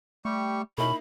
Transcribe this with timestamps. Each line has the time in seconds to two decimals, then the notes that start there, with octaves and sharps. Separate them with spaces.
0.25 G3 A3 G4 C#6
0.78 B2 A#3 C#4 D#4 E4 B5